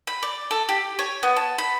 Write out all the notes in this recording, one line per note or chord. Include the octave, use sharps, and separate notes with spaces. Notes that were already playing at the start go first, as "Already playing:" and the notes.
B5
D5
A4
G4
C#5
B3
A5
B5